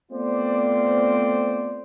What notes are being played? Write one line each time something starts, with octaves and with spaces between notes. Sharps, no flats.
A3 B3 C4 F4 C5 D5